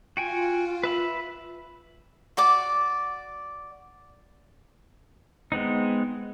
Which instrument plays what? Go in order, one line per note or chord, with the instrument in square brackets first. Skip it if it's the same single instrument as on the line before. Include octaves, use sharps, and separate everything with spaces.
[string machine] F4 [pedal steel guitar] F#4 G5 G#5
[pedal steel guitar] B4 E5 B5
[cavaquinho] F#4 D5 D6
[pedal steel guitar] G#3 B3 C4 D#4